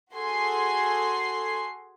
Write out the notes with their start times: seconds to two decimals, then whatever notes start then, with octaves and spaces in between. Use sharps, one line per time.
0.15 F#4 G#4 A4 G#5 C6 C7